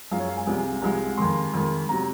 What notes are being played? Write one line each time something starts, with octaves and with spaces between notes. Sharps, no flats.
F#2 F3 G#3 F5
C#5
F5
G#5
C2 C3 F3 G#3
C2 C3 F3 G#3
F2 D#3 G#3 C6
F2 D#3 G#3
C3 F#3 A#5